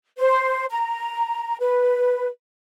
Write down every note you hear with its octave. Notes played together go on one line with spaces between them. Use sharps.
C5
A#5
B4